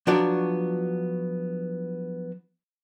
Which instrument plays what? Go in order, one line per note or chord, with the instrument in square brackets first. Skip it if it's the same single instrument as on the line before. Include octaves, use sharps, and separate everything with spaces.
[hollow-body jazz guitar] F3 F#3 B3 D4 F#4 D5